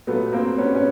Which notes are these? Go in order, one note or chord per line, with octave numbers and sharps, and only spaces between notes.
A#2 F#3 A3 B3
A#3 C4
B3 C#4
B3 C#4